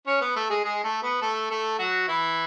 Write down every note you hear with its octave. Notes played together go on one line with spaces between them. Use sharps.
C#4 C#5
B3 B4
A3 A4
G#3 G#4
G#3 G#4
A3 A4
B3 B4
A3 A4
A3 A4
F#3 F#4
E3 E4